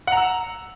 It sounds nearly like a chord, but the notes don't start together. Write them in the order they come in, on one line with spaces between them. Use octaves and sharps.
F#5 A#5 E6